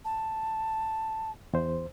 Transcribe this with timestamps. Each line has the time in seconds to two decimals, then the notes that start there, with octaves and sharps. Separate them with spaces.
0.05 A5
1.53 E2 C5